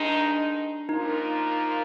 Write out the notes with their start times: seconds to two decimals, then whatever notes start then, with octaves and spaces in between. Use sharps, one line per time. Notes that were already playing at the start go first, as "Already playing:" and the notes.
Already playing: G2 D#3 G#3 D4 D#4
0.89 A#2 F3 A#3 D#4 F4 A#4